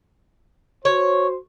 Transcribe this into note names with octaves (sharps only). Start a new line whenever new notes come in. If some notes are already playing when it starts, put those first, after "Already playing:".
F#4 C5 C#5